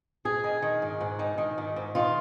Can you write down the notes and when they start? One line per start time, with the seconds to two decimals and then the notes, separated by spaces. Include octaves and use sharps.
0.25 G#2 G#4
0.44 D#3
0.62 D#3
0.82 G#2
1.01 G#2
1.19 D#3
1.38 D#3
1.58 G#2
1.76 G#2
1.95 D#3 F4